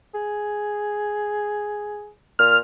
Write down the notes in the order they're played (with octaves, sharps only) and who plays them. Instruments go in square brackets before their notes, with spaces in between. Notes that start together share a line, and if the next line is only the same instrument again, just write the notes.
[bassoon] G#4
[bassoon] A#2 [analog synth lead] F6